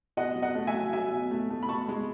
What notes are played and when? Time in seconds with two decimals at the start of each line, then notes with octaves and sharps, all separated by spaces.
0.17 B2 D#5 F#5
0.36 F#3
0.42 D#5 F#5
0.55 A3
0.67 E5 G#5
0.74 F#3
0.93 F#3 E5 G#5
1.12 B2
1.31 A3
1.50 A3
1.63 B5
1.69 B2 A5 C#6
1.88 G#3